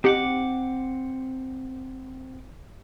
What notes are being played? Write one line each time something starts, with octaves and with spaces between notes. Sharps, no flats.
C4 D#4 G4 F#5 D6